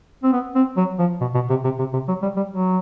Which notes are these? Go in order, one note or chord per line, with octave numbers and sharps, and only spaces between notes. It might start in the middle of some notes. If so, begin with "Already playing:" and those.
C4
B3
C4
F#3
F3
B2
B2
C3
C3
C3
C3
F#3
G3
G3
F#3